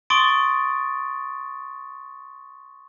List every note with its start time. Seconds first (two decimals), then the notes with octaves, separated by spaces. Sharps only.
0.10 C6 C#6 D#6 A6 D7